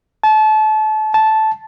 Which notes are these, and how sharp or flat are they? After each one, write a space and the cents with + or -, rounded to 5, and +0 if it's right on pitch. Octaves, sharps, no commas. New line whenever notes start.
A5 -30
A5 -10